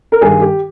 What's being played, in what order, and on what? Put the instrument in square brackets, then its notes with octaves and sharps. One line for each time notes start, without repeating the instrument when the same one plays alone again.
[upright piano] A#4
G2 D#3 G3 G#4
G4